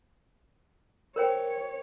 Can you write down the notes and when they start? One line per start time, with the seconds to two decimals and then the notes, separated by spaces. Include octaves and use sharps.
1.16 A#4 C5 C#5 G5